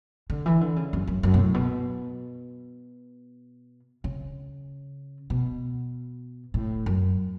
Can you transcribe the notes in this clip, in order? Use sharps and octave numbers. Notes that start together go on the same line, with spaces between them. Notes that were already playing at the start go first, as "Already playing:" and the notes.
D3
E3
D3
C#3
F#2
F#2
F#2
B2
A2
B2
C#3
B2
A2
F#2